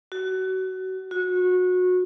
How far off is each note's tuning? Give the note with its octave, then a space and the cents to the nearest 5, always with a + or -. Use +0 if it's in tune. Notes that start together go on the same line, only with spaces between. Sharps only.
F#4 +25
F#4 -25